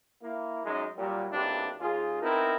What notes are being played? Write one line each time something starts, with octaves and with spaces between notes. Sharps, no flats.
A#3 E4
F#2 G#3 D#4
A#2 F#3 G3
B1 A#2 C4 D4 E4 G4
D#2 F4 G#4
B3 C4 D#4 E4 A#4